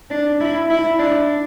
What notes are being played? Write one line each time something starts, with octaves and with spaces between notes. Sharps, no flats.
D4
E4
E4
D4